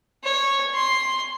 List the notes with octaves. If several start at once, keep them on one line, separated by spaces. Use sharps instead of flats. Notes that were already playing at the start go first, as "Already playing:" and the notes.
C#5
C6